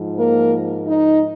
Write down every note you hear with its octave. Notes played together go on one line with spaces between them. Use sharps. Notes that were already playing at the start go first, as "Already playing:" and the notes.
Already playing: G#2 F3
A#3 A#4
D#4